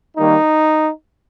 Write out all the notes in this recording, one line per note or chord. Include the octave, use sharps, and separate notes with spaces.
D#3 G3 A#3 D#4